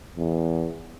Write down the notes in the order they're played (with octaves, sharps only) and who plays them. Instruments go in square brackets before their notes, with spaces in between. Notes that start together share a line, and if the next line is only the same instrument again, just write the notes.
[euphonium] E2